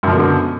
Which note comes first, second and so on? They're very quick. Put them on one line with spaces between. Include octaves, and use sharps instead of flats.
F#2 F3 B2 D3